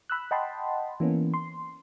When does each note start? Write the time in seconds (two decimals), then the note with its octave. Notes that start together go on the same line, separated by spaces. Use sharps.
0.10 B5 E6 F#6
0.31 D#5 F#5 G5 A5 B5 C6
1.00 E3 A#3 B3 C#4
1.34 C6